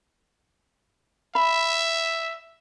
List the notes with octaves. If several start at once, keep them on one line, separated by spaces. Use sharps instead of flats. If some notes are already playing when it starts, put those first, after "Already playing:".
E5 B5